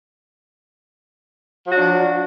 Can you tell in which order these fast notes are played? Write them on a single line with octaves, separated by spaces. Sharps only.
F#3 F#4 D4 F3